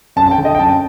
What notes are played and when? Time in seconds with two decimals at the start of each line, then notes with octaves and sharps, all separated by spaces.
0.16 F#2 A5
0.26 A5
0.31 G5
0.38 D3
0.45 D#5
0.55 G5
0.59 F#2 A5